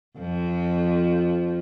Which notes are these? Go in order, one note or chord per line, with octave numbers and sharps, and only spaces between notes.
F2 F3